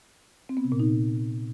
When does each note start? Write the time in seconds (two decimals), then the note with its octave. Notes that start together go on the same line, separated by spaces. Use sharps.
0.49 C4
0.57 B3
0.64 C3
0.72 A#2
0.79 D#4